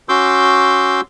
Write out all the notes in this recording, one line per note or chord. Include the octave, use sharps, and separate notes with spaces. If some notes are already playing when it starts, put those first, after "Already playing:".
C#4 F#4 C6 D6 E6 G6